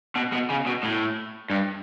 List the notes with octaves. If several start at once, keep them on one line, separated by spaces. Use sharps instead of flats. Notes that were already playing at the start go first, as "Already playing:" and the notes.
B2
B2
C#3
B2
A2
G2